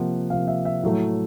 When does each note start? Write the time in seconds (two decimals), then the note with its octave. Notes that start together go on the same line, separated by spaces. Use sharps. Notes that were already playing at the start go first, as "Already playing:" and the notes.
Already playing: C3 F3 A#3 F#5
0.30 C3 F3 A#3 F5
0.48 E5
0.65 E5
0.83 A2 F#3 A3